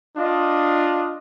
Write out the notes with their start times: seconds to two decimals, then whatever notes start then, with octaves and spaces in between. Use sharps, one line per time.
0.17 D4 F4 D#5